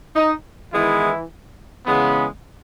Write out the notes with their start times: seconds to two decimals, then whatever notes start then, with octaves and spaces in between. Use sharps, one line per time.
0.15 D#4
0.73 D#3 E3 G#3 B3 E4
1.86 C#3 E3 G#3 B3